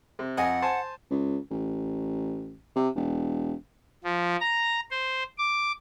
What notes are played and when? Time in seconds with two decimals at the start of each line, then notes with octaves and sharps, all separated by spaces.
0.19 C3
0.37 F2 D#5 F#5 G#5
0.62 C5 G#5 A5
1.10 C#2
1.51 A1
2.76 C3
2.95 E1
4.04 F3
4.40 A#5
4.91 C5
5.38 D6